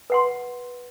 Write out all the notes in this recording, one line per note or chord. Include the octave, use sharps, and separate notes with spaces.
B4 F#5 C6